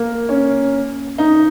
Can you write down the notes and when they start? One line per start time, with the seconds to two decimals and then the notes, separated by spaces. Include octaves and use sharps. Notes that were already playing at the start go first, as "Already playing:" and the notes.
Already playing: A#3
0.29 C#4
1.18 D#4